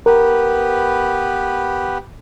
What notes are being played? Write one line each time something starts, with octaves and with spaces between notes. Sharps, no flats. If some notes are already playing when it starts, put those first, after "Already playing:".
B3 G4 A#4 B4